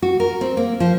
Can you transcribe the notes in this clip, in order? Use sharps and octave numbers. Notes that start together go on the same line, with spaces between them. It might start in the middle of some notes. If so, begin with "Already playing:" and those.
F#4
A#4
C4
A#3
F3